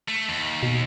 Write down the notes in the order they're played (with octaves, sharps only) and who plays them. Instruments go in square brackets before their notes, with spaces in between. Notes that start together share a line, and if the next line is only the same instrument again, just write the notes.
[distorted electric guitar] A3
D#2
[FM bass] B2